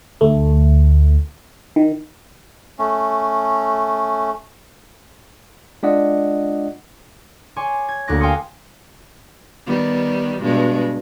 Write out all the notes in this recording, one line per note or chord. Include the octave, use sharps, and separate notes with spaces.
D2 A3
D#3
A3 C#4
G#3 D4 F4 D5 D#5 F#5
C#5 G#5 C6 D6
G#6
D2 A#3 D6 F#6 A#6
F5 G5 G#5 C6 D#6 C#7
D#3 G3 B3
G2 B2 G#3